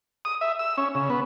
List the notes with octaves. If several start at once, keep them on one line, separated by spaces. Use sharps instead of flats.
D#6
E5
E6
C#4
C#3
B3